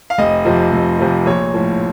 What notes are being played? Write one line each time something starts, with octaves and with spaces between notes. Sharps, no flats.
F5
F1 D#5
F2 C3 F3
F1
F2 C3 F3
A#1 C#5
A2 F3